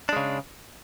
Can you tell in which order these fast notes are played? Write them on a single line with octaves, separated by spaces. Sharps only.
D4 G#3 C#3